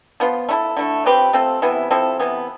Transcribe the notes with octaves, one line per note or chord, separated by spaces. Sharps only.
F3 B3 F4
A3 E4 A4
D3 A3 E4
F3 C4 G4 B4
A3 C4 F4 A4
C3 E3 B3 E4
F3 C4 E4 A4
C3 E3 B3